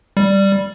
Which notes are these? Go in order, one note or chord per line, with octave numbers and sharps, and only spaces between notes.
G3